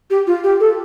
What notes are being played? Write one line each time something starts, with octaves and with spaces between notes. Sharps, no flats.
G4
F4
G4
A4